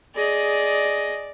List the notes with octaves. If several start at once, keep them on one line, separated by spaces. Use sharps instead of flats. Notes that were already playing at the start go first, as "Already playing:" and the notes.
G#4 D5 D#5